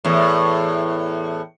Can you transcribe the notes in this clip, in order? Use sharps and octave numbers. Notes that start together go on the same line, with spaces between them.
E2 A2